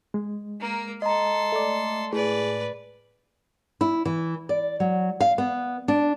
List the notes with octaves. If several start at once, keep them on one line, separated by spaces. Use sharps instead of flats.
G#3
A#3 A#4
A4 D#5 A#5 C6
A3 D5
A2 G#4 B4 D5
E4
E3
D5
F#3
F5
B3
D4